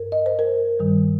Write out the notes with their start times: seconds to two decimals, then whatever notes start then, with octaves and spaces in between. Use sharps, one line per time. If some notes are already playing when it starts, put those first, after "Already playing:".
Already playing: G2 A#4
0.12 D#5
0.26 C5
0.39 A#4
0.79 G2 D#3 G3